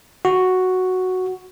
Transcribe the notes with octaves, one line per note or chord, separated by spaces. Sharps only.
F#4